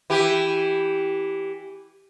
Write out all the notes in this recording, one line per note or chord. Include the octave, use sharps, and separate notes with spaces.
E3 G4